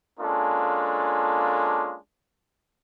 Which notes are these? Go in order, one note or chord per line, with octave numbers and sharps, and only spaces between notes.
G#3 A#3 C#4 D4 F4 A4